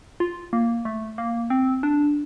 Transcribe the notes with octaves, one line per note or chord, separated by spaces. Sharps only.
F4
A#3
A3
A#3
C4
D4